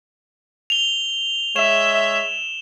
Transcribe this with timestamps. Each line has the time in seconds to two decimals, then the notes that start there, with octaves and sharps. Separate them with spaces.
0.70 F7 G7
1.56 G#3 C#5 E5 E7